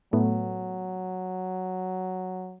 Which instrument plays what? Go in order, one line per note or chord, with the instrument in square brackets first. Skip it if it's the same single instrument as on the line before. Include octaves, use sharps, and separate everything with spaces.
[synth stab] A2 A3 B3 [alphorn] F#3